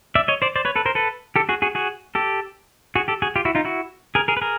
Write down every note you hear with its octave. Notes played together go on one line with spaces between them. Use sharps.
D5 E5
C#5 D#5
C5 D5
C5 D5
B4 C#5
A4 B4
A#4 C5
A4 B4
G4 A4
F#4 G#4
F#4 G#4
F#4 G#4
G4 A4
F#4 G#4
G4 A4
F#4 G#4
F4 G4
E4 F#4
D#4 F4
E4 F#4
G#4 A#4
G#4 A#4
B4
G#4 A#4